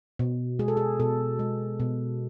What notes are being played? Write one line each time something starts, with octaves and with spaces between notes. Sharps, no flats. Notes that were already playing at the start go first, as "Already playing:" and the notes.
B2
G#3 G#4
A4
G#4
B2 A4
G#3
B2